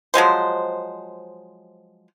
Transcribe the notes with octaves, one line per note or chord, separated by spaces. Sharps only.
F3 F#3 G#3 C5